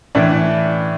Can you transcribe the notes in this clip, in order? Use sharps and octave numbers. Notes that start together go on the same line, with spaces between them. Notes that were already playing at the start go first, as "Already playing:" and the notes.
A2 E3 D4